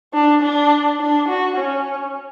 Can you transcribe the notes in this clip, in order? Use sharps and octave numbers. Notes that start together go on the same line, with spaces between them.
D4
D4
D4
F#4
C#4